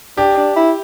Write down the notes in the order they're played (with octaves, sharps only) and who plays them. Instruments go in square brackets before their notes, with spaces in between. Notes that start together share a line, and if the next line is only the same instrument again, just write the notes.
[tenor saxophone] D4 [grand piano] G4
[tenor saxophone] D4
E4